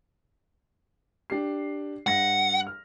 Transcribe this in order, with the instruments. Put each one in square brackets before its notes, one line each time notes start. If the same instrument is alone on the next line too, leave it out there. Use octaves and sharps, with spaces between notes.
[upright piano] D4 G4 C7
[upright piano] G2 A#6 [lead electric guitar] F#5
[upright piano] F6